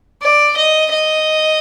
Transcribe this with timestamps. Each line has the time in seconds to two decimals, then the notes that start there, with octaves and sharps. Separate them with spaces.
0.22 D5
0.57 D#5
0.91 D#5